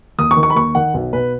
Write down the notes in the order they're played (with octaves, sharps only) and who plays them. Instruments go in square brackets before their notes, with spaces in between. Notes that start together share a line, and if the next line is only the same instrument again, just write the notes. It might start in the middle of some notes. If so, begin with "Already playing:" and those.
[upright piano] D#2 D#6
C#6
D#3
C#6
B5
D#2 C#6
D#3 F#5
B1
B2 B4